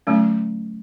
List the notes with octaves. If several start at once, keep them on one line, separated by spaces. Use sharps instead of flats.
D3 F#3 A3 C#4